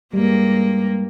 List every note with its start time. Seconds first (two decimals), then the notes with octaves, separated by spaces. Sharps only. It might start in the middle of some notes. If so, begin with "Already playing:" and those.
0.13 G2 G3 G#3 A#3